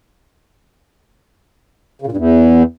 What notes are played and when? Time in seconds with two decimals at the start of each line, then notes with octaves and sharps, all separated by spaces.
2.02 C#3
2.07 A#2
2.12 G2
2.17 E2